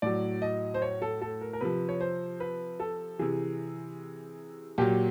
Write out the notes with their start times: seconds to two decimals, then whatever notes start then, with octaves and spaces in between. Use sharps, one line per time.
0.02 A2 F#3 D5
0.42 D#5
0.74 C5
0.82 C#5
1.02 A4
1.22 A4
1.41 A#4
1.53 A#4
1.61 C3 F3 B4
1.89 C#5
2.01 C5
2.40 B4
2.80 A4
3.19 C3 E3 G#4
4.78 A#2 F#3 G4